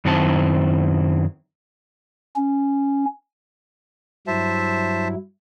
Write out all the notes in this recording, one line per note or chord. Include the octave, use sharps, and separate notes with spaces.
F#2 D#3 C4 E4 A5
C#4
G2 F#3 E4 C5 E5 A5